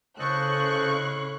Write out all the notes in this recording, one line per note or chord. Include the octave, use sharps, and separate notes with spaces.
A2 C#3 A4 C5 D#5 C#6 F#6